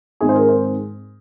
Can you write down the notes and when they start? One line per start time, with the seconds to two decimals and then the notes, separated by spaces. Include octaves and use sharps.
0.21 G#2 D#3 G#3 C4 G#4
0.29 C5
0.35 A#4
0.49 C5